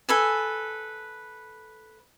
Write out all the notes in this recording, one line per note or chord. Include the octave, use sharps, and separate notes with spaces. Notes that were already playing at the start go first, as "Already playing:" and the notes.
A4 B4 G#5